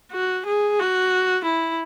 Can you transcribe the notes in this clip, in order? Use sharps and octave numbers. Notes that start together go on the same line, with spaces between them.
F#4
G#4
F#4
E4